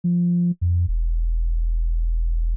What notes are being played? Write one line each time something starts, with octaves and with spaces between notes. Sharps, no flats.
F3
F2
E1